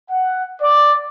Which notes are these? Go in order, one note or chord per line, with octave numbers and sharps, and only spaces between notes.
F#5
D5